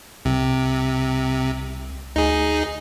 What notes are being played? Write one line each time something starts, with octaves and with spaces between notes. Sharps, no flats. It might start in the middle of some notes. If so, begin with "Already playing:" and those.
C2 C3
D2 D#4 G#4